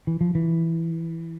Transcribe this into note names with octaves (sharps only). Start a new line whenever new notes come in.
E3
F3
E3